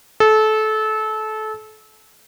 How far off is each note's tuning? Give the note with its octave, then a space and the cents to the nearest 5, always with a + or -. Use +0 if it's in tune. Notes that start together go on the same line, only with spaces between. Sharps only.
A4 -25